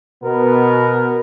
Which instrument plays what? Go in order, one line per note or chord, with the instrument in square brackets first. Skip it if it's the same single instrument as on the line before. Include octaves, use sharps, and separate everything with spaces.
[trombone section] B2 B3 [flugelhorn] A#4